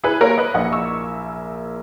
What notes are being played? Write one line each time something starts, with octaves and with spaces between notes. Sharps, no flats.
E4 G#4 B4
A#3 A#4 C#5
A#3 B4 D#5
A#1 D#5 F#5
C#6 E6